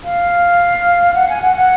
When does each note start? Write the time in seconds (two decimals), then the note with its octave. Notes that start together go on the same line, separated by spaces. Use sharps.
0.04 F5
1.14 F#5
1.29 G#5
1.42 F#5
1.56 F#5